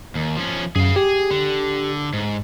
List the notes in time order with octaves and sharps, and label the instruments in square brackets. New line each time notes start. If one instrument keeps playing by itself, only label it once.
[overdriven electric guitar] D#2
F3 C#4
[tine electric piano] F#2 [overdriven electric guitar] G#4 F5
[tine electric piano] G4 [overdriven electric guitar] G#4
[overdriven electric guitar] D3
G#2